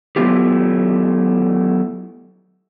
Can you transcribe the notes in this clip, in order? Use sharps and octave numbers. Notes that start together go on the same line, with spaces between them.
F#3 A3 B3 E4 F4 G4